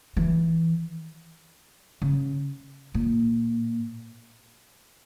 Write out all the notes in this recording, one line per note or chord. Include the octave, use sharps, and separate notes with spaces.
E3
C#3
A#2